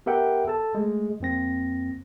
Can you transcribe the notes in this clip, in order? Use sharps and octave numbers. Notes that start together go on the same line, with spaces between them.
B3 G4 A#4 E5 F#5 G5
A4 A5
G#3 A3
F2 A#3 C4 A#6